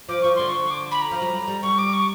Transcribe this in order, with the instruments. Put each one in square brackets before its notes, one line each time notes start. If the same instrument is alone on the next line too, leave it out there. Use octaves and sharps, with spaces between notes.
[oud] F3 [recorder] D6
[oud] F3 [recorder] C#6
[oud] D3 [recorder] C6
[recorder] C#6
D6
B5
A#5
[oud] F3
F#3
G3
[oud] G3 [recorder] C#6
[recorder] D6
C#6